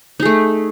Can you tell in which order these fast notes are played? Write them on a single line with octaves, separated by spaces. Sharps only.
D#4 G#4 A3